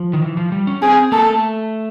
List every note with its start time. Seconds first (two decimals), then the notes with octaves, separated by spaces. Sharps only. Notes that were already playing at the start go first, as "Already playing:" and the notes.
Already playing: F3
0.13 D#3
0.22 E3
0.37 F3
0.52 G3
0.67 C#4
0.82 C4 G#4
1.12 A#3 A4
1.26 A3